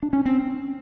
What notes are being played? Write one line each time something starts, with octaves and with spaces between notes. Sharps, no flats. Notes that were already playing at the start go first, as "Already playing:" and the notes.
D4
C#4
C4